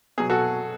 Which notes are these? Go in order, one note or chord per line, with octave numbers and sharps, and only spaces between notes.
B2 F#3 G#4
F#4 A4